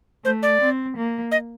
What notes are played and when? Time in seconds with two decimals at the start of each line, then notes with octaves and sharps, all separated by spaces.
0.24 A3 C5
0.43 D5
0.61 C4
0.96 A#3
1.32 D#5